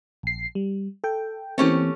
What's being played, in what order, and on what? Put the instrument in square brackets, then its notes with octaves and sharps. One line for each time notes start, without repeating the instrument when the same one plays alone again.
[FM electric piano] A#1 C7
G3
A4 G5
[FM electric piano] E3 A#3 C4 [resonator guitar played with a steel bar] A3 C#4 G4